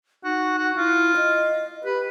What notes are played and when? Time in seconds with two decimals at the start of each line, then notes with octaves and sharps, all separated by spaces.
0.24 D#4 F#4
0.58 F#4
0.77 E4 F4
1.17 D#5
1.84 G4 B4